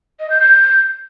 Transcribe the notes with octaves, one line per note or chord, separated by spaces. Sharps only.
D#5
G6
G6